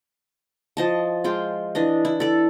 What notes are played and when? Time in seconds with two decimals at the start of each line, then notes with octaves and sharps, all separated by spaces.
0.77 F3 D#5 A5
1.24 G#3 F4 G5
1.75 E3 D4 D#5
2.05 E4
2.20 A4 D5